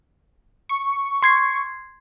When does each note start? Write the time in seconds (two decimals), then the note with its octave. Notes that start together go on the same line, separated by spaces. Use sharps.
0.69 C#6
1.23 C6 G#6 C7